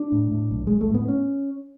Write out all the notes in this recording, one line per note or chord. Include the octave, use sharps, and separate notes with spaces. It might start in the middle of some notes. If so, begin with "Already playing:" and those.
Already playing: D4
A2
A2
B1
B1 G#3
A3
A2 B3
C#4